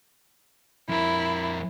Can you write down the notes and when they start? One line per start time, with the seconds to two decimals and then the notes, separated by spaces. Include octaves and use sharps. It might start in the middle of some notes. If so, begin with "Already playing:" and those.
0.89 F2 E4 A#4